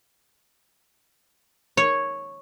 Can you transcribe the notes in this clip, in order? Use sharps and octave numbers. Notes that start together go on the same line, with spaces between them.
C#5